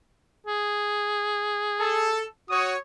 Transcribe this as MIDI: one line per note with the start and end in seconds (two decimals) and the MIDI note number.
0.47 2.20 68
1.80 2.23 69
2.50 2.74 66
2.50 2.76 73
2.50 2.76 87